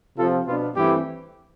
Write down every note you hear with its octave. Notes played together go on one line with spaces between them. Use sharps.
C3 F3 C4 F4 A4
B2 B3 D4 F4
G2 E3 A3 C4 E4 G4